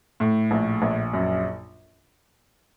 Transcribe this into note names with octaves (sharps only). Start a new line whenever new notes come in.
A2
A#1
A#1
F#2